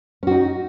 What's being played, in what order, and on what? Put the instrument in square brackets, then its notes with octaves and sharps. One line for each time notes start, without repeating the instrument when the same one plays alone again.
[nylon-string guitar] C#4
F#4
D#4